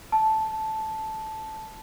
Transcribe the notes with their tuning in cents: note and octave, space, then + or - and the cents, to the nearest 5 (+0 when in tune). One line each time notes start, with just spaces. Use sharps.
A5 -10